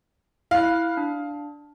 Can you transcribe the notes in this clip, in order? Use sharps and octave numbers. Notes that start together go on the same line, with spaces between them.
E4 F5 F6 F#6
D4